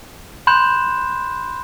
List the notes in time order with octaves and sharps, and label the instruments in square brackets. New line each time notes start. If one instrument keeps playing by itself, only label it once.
[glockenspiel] B5 C6 F#6 G6 E7